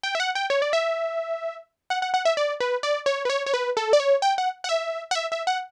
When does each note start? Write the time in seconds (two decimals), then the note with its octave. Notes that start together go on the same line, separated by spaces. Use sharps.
0.03 G5
0.15 E5
0.20 F#5
0.35 G5
0.50 C#5
0.62 D5
0.73 E5
1.90 F#5
2.02 F#5
2.14 F#5
2.25 E5
2.37 D5
2.60 B4
2.83 D5
3.06 C#5
3.25 B4
3.30 C#5
3.46 C#5
3.54 B4
3.77 A4
3.93 D5
4.00 C#5
4.22 G5
4.38 F#5
4.64 F#5
4.69 E5
5.11 F#5
5.15 E5
5.32 E5
5.47 F#5